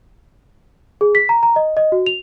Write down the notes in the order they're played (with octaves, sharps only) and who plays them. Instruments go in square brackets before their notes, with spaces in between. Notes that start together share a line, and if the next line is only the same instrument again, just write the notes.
[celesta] G#4
B6
A#5
A#5
D#5
D#5
F#4
F7